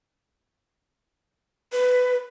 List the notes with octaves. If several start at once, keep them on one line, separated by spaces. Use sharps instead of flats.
B4